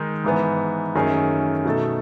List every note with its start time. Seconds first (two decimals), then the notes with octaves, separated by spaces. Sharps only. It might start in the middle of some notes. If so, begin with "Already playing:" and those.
Already playing: D#3 G#3 D#4
0.24 G#2 E3 B3
0.95 F#2 D#3 A3 C#4 G#4
1.65 B2 A3 D#4 A4